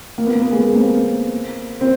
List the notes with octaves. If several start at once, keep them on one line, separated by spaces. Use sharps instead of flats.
A#3
B3
A#3
B3
G#3 A#3
A#3 C4
C4